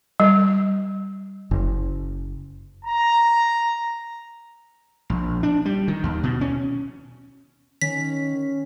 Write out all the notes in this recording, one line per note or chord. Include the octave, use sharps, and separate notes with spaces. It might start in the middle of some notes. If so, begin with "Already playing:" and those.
G3
F#1
A#5
A#1
D4
G3
D#3
D#2
B2
C#4
D#3 C#4 B6